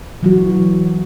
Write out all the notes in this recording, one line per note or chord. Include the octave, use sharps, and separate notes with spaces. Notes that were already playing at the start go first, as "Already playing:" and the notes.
E3 F#3 F#4